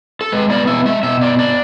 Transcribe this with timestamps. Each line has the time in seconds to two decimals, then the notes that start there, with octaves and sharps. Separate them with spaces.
0.21 A4
0.32 G#3 B4
0.50 B3 D5
0.67 B2 E5
0.85 G#3 E5
1.03 B2 E5
1.21 B3 D5
1.39 D4 D5